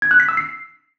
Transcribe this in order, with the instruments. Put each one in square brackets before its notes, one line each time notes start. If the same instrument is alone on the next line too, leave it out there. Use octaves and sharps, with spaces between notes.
[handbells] G#6
F#6
B6
E6
C7